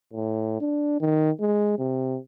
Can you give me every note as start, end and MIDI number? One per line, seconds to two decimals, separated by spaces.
0.13 0.58 45
0.60 0.97 62
1.01 1.31 51
1.40 1.74 56
1.79 2.18 48